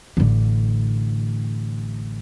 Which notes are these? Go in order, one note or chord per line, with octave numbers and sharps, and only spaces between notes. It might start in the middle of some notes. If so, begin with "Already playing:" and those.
A1 D3